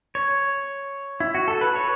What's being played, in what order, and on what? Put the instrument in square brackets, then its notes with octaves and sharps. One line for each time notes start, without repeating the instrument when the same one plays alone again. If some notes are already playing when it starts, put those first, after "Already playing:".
[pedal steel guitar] C#5
E4
F#4
A4
B4
C#5